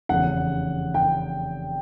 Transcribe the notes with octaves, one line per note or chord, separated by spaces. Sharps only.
F1 E2 C#3 F#5
G5